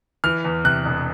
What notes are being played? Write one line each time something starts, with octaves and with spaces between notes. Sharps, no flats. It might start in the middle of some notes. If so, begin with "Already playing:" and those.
E3 F6
E2
C3 F#6
E1